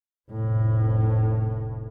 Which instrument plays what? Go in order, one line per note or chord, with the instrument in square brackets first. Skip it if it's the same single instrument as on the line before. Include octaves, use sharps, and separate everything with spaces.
[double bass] F1 A2